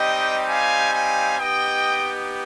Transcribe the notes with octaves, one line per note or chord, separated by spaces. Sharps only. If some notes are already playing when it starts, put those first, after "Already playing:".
Already playing: G3 C4 D#4 G4 D#5 G5
F5 G#5
F5 G#5
B3 D#4 G4 D#5 G5